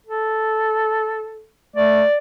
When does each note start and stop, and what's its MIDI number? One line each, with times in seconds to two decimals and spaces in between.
0.06 1.45 69
1.76 2.02 57
1.76 2.16 74